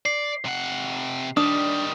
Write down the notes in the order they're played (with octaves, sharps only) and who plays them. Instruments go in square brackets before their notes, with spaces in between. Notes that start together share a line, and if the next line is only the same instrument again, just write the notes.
[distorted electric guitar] D5 [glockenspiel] C7
[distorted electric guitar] C3 F#5
[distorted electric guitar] D#3 G3 [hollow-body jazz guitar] D4 [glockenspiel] D#6